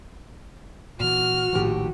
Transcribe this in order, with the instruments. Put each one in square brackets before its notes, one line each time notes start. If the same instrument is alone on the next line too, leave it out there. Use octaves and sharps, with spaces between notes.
[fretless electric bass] A#2 E3 [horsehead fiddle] F#4 [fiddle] F6
[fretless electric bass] A#1 D#3 F3 [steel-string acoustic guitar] D#2 A2 G4